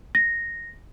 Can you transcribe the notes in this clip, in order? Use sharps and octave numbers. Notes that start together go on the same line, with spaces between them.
A#6